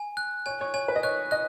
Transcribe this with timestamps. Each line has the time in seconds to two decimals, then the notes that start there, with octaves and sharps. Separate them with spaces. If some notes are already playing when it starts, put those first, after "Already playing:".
Already playing: G#5
0.17 F#6
0.46 C#5 G#5
0.61 C#5
0.74 C#5 G#5
0.88 B4
0.96 D#5
1.03 C#5 F#6
1.31 D#5 F#6